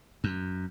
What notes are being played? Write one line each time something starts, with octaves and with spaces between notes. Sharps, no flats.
F#2